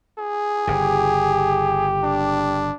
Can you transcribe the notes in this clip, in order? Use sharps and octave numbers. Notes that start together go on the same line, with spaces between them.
G#4
G1 C#3 G4
D4